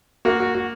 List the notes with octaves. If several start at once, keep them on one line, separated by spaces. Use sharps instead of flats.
A#3 F#4
F#4
F#4